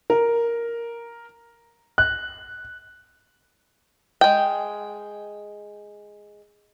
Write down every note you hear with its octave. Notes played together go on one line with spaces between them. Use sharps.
A#4
F#6
G#3 G5